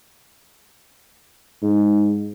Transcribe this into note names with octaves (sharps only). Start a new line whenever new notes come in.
G#2